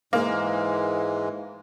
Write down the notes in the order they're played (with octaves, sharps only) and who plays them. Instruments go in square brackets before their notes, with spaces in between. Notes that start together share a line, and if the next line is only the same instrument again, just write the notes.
[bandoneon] G#2 E3 G#3 [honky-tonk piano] A#3